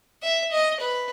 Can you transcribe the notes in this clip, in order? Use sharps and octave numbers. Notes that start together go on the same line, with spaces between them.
E5
D#5
B4